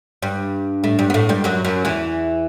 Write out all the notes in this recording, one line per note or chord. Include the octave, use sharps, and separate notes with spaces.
G2 G3
A2 A3
G2 G3
B3
A2 A3
G2 G3
F#2 F#3
F#2 F#3
E2 E3